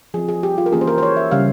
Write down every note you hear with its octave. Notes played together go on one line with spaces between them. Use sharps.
F3 C4 G#4
G#4
G4
F4
A#4
E3 A#3 C#4 G#4
C5
A#4
C5
C#5
E5
C#3 G3 C#4 F5